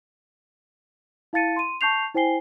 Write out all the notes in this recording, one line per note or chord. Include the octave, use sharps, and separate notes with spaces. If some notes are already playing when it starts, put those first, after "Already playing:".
E4 F5 A5 A6 C#7 D#7
C6 D#7
A5 C#6 G6 C7 F7
E4 C5 G5 G#5 C7 G7